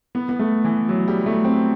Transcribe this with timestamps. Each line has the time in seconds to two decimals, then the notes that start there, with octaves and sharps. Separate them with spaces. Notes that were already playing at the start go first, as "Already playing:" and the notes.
0.15 B3
0.29 B3
0.39 A3
0.64 E3
0.89 F#3
1.08 G3
1.26 A3
1.45 C4